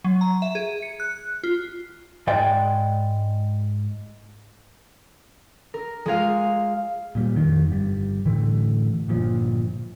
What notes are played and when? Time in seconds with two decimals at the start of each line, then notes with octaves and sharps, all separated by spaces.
0.04 F#3
0.21 A#5
0.42 E5
0.55 G#4
0.82 C#7
1.00 F#6
1.43 F4
2.27 G#2 G#3 D5 G5
5.74 A#4
6.06 G#3 F4 G#4 F5
7.15 A#2 G3
7.36 F2 D#3
7.68 G1 G3
8.25 A2 D3 E3 A3
9.08 G1 A#2 F3